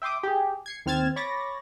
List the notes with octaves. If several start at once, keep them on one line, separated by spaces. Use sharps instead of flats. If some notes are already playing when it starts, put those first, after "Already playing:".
E5 G5 C6 D6 D#6
G4 G#4
G#6 C7 C#7
D#2 C4 F6 G#6 A6 E7
C#5 B5 C#6 D6 A6 A#6